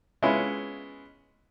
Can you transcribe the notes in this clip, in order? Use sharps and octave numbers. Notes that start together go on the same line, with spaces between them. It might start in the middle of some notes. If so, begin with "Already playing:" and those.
G#3 B3 C#4 E4 F4